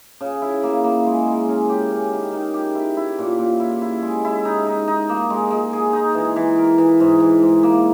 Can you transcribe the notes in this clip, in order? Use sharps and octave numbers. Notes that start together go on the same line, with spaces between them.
C#3
E4
A#3
A#3
G#3
G#3
C#4
G4
C#4
D#3
D#3
G4
E4
E4
A#2
A#2
E4
E4
G#3
E4
D#4
D#4
D#4
A#3
G#3
G#3
G#4
D#4
E3
E3
A#4
E3
G#2
E3
G#2
A#3